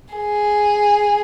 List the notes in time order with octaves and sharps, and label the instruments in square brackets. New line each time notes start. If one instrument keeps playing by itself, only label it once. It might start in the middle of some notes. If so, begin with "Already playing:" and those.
[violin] G#4